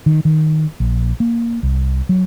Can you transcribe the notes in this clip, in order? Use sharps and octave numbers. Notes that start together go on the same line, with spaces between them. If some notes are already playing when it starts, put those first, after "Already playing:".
D#3
D#3
A#1
A#3
C2
F#3